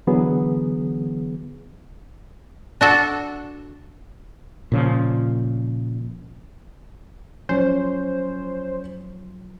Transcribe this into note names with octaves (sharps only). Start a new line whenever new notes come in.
D3 E3 F#3 B3 G#4
D4 F#4 A4
A#2 C#3 F3
F3 F#3 C#4 C5 C#5